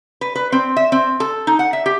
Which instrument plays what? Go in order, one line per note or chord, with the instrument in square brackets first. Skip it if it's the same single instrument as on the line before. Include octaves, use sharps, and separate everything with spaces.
[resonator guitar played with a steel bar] B4
B4
C4
E5
C4
A4
D#4
F#5
E5
G4